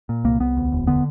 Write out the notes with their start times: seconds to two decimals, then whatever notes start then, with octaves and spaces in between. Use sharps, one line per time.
0.09 A#2
0.24 C2 A#3
0.40 C2 B3
0.57 D2
0.72 E1
0.87 D3 B3